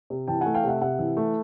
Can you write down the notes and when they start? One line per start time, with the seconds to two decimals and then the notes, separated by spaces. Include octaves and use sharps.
0.10 C3
0.28 E3 G5 A5
0.41 A3 F#5 G#5
0.54 F5 G5
0.64 C3 E5 F#5
0.81 C3 E5 F#5
0.99 E3
1.17 A3